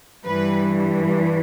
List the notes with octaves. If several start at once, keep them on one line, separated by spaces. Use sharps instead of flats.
G2 E3 G3 B4